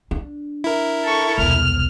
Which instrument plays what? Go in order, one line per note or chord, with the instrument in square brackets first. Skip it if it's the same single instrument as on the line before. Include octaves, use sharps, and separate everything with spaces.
[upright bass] D4
[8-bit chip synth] E4 A#4
[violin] A4 C#6
[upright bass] E1 C2 [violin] F6